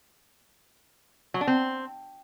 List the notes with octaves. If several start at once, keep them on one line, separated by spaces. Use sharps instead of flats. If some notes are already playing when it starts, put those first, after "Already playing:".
F#3
D4
C4